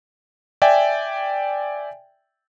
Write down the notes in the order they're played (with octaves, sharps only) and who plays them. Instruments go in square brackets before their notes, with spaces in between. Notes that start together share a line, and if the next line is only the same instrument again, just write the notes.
[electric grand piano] D5 E5 G5 G#5